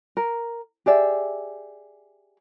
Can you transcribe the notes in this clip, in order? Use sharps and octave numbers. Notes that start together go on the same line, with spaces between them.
A#4
G4 G#4 D5 E5